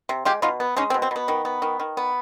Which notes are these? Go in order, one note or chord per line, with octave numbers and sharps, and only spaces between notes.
C3
G#3 F4 G4
B2 D#4 F4
B3
G#3 C#4 D#4
C4
B2
C4
B2 B3
D#3
B3
D#3
D#3
B3